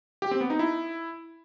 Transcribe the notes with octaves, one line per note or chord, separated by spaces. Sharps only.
G4
C4
B3
D#4
E4